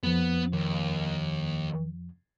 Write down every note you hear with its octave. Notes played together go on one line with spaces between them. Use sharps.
F2 F3 B3
D#2